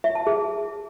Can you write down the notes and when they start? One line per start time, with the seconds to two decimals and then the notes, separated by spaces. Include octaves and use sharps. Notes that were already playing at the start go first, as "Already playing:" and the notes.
0.04 E5
0.15 A5
0.27 G#4